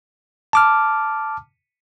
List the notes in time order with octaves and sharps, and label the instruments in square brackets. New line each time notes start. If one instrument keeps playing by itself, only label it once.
[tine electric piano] A5 D6 F6